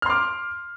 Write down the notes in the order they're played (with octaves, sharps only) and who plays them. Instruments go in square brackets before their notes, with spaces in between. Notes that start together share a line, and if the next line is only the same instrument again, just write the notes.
[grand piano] F6
C6
D6